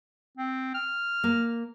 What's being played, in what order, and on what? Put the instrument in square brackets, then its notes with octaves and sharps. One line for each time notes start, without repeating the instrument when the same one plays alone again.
[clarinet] C4
F6
[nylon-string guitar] A#3